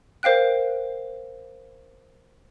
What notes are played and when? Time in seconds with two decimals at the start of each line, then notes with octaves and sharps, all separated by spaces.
0.23 A#4 C5 F5 G5 F#6